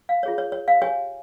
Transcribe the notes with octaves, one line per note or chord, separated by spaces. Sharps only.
F5
F4 G#4 C#5
C#5
C#5
F5
G4 C#5 G#5